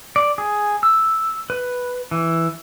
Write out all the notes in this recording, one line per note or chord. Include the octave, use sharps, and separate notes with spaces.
D5
G#4
E6
B4
E3